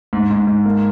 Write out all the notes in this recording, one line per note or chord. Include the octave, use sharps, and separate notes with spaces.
G#2
G#2
G#2
A#3